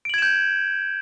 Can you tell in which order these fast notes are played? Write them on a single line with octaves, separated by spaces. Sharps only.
D7 F#7 G#6 E7 G6